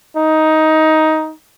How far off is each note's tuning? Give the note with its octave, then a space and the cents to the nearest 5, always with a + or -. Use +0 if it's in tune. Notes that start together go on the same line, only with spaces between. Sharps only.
D#4 +10